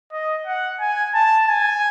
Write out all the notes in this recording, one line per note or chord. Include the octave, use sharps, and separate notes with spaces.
D#5
F#5
G#5
A5
G#5